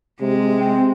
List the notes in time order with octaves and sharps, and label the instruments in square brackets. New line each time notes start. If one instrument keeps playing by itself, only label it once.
[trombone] C3 [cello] G#3
[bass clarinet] C4